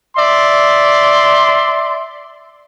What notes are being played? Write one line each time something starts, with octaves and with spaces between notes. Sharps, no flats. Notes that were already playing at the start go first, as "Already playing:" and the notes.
D5 E5 C6